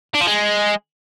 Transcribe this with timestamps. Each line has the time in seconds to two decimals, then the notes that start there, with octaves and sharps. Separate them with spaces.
0.14 D4
0.20 F3
0.26 G#3